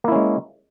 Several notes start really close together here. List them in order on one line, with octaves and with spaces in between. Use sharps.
A#3 E4 C#4 G#3